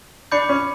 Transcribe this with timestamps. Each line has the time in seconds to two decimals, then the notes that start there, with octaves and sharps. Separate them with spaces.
0.32 D4 B5 D6 G6 C#7
0.49 C#4